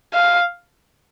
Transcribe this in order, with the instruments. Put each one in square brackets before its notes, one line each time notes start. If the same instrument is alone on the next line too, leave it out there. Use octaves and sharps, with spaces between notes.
[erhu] F5